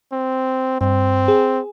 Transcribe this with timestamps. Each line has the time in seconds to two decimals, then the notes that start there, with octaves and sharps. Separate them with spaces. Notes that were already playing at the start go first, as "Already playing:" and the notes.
0.12 C4
0.81 G2 C4
1.28 G#4